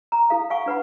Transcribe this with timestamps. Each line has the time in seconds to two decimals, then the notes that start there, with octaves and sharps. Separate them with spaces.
0.12 A#5
0.30 E4 A4 F5
0.50 F5 F#5 G#5 C#6
0.66 D4 B4 F#5 B5